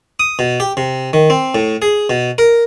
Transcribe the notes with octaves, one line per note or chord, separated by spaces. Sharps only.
D#6
B2
G4
C3
D#3
C4
A2
G#4
B2
A#4